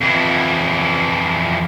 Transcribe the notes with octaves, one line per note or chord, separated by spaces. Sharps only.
F2 E3